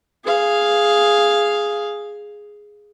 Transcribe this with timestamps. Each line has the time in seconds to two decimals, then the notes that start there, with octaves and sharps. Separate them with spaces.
0.25 G#4 F5